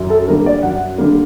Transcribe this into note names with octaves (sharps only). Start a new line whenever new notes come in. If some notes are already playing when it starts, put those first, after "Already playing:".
Already playing: F#2
A4
D3 G3 A#3 A#4
D5
F#2 F#5
D3 G3 A#3